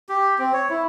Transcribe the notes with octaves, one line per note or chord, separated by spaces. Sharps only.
G4
C4
C#5
E4